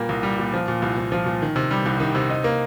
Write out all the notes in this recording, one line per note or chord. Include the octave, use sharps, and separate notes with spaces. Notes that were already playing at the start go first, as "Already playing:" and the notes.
Already playing: A#2 G3 A#3
C2
G3
A#2
F3
A#2
C2
C2
F3
A#2
D#3
C3
G3
C2
D#3
C3
D#4
A#3